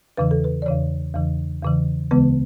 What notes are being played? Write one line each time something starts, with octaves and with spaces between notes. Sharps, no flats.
E2 C#3 E3 B4
A4
B4
D5
E2 C#3 E3 C#5
E2 C#3 E3
E2 C#3 E3
D2 C#3 E3 G#3 B3 B4